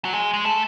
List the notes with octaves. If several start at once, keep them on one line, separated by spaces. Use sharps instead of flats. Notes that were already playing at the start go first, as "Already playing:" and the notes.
F#3
G#3
G#3
A3